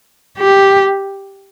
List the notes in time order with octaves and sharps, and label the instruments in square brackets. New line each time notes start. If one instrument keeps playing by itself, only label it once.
[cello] G4